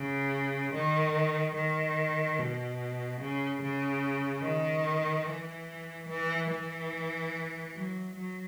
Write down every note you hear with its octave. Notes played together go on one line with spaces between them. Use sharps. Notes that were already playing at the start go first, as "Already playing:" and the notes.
Already playing: C#3
D#3
D#3
B2
C#3
C#3
D#3
E3
E3
E3
F#3
F#3